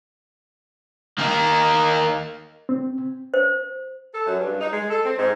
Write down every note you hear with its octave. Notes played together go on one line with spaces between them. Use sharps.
D#3 A#3
C4
C5
A4
F#2
G2
D#4
G#3
A4
C4
G#2